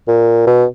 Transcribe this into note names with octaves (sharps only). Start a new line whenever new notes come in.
A#2
B2